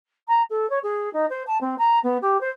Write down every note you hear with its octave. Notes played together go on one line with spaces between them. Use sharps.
A#5
A4
C#5
G#4
D#4
C5
A5
C4
A#5
B3
G4
C5